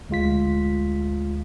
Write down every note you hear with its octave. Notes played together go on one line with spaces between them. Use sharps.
D2 G#3 F4 B6